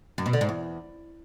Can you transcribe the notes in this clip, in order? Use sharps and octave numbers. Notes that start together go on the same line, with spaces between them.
F#2
B2
D3
G#2
E2